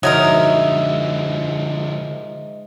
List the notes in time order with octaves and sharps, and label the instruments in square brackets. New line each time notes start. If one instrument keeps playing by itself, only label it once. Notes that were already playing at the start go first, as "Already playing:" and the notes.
[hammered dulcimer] G#2 E5 [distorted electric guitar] D3 F3 [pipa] F#3 D#4 A#4 [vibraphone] D#5